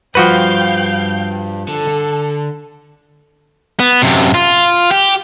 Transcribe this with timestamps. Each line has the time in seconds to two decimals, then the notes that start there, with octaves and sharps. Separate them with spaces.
0.15 G2 F3 G3 F#4 B4 F5 G5 G6
1.68 D3 A4
3.80 B3
4.02 F#2 C3
4.34 F4
4.91 G4